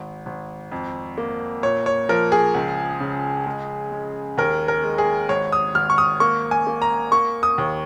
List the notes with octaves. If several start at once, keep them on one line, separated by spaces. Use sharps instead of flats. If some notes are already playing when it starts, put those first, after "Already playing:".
Already playing: G#1
G#1
F2
A#3
A#2 C#5
C#5
F3 A#4
G#4
C#2
C#3
G#3
G#3
D#2 A#4
A#4
G#3
G#4
G#1 C#5
D#6
G#1 F6
C#6
D#6
A#3 C#6
G#5
A#3
A#5
A#3 C#6
D#6
D#2